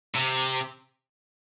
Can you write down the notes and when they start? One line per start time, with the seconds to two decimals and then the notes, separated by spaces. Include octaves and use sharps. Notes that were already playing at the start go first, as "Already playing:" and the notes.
0.14 C3